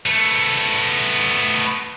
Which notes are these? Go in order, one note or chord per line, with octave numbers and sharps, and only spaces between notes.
A3 B3